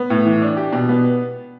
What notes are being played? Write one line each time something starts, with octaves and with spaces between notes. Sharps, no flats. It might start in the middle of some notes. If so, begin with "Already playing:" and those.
Already playing: B3
A2
E3
D4
G4
B2
B3